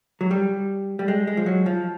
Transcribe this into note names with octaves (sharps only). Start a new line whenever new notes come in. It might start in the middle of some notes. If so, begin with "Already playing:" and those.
F#3
G3
G3
G#3
G#3
F3
F#3
F3